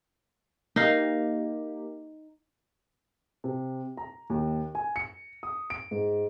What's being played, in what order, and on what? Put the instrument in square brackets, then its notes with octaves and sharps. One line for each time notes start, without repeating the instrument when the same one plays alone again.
[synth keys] A#3 G4 [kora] D#4 F5
[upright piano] C3
A#5
D#2
G#5
C#7
D#6
D7
G#2